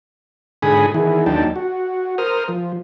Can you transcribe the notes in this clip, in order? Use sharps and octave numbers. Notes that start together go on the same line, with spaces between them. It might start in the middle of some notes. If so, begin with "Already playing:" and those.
G#2 D3 G#4 G#5 B5 D#6
D#3 E3 E4 G#4
D#2 F#3 D4 D#4 G5 A5
F#4
A#4 C5 D#6 F6
F3